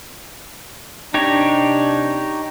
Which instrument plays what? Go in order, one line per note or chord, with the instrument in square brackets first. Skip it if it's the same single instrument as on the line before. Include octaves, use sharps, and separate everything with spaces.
[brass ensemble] C3 D4 [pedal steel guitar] D#4 G4 C#5